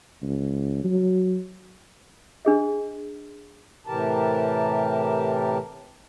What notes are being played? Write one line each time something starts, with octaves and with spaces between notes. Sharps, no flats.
C#2
F#3
D4 G#4 D#5
A2 C3 E3 G4 A#4 A5